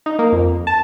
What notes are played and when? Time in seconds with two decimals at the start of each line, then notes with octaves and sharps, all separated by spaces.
0.06 D#4
0.19 A#3
0.32 F2
0.67 A5